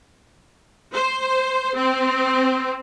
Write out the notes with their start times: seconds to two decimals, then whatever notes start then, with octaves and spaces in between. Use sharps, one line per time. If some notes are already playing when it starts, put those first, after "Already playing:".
0.94 C5
1.76 C4